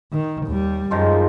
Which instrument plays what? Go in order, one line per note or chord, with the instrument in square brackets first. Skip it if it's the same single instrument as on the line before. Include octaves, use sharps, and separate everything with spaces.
[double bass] D#3
D#2 G3
[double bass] F#2 [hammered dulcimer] D#3 F3 G#3